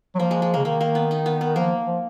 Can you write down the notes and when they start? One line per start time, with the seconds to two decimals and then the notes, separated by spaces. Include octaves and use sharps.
0.15 F#3
0.19 F3 A#3
0.31 G#3
0.42 G#3
0.54 C#3 A#3
0.65 D#3 A#3
0.81 A#3
0.95 B3
1.11 D#4
1.26 B3
1.41 B3
1.56 F3 A#3
1.87 F3